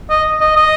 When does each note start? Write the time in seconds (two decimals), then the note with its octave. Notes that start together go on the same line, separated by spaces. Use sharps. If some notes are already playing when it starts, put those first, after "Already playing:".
0.10 D#5
0.41 D#5
0.57 D#5